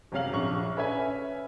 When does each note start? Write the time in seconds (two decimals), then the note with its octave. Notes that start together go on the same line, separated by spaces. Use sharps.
0.12 F#1 C3 F#3 F5 F#7
0.33 A#1 C#6
0.77 C#4 B4 E5 G#5